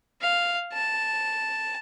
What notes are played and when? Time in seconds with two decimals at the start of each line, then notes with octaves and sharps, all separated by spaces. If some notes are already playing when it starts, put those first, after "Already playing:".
0.21 F5
0.73 A5